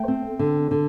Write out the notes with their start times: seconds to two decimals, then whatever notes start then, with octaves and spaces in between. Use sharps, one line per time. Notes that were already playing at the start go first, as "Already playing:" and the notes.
Already playing: A3 G5
0.08 C4
0.39 D3
0.71 D3